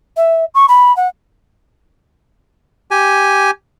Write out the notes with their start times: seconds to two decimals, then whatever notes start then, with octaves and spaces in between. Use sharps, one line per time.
0.16 E5
0.54 C#6
0.68 B5
0.96 F#5
2.91 G4 G#5